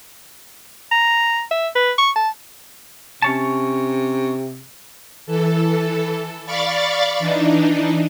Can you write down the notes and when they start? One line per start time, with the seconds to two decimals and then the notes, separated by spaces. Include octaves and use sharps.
0.91 A#5
1.51 E5
1.75 B4
1.98 C#6
2.16 A5
3.22 C3 C#4 C#5 A5
5.26 E3 A4
6.46 D5 F5 B5 C#6 D6 A6
7.19 E3 D4 D#4